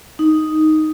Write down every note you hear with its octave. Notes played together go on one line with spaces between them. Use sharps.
D#4